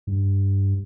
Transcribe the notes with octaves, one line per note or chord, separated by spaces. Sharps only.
G2